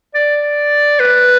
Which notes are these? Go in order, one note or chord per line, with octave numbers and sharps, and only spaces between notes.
D5
B4